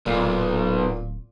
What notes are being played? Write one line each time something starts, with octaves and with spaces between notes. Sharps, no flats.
D1 B1 A#2